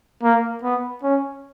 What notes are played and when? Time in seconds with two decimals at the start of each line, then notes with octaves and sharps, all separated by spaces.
0.23 A#3
0.63 B3
1.03 C#4